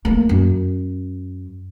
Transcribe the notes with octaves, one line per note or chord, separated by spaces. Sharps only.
A3 A#3
F#2